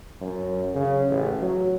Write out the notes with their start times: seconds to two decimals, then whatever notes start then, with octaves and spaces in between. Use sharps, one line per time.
0.21 F#2
0.74 C#3
1.10 A1
1.41 F#3